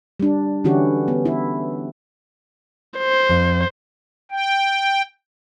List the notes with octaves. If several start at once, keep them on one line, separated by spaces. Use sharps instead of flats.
G3 D4
D3 E3 C#4 E4 F#4 G4
B3
E4
C5
F2
G5